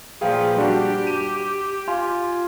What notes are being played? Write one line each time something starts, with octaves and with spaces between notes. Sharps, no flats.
A#2 F3 G#4 B4 F5 G5
G3 D4 F#4 G4
D#7
F4 G#5